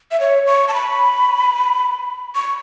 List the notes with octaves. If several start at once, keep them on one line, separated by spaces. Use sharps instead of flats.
E5
C#5
C#6
A5
B5
C#6